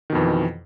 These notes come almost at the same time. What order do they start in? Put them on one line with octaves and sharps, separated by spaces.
D#3 B2 F2 E3